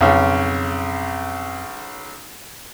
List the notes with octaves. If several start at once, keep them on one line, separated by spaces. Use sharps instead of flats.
B1 F2 C#3